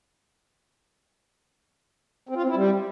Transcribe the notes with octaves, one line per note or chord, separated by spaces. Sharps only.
C4
F4
C4
E4
G3